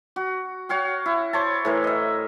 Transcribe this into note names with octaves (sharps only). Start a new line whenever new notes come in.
F#4
F#4 C#5 F5 G5
E4
C5 C#5 A5
A2 E3 A#4
D#5 E5